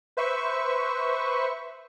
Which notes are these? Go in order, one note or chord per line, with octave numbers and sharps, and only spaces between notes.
B4 C5 E5 C#6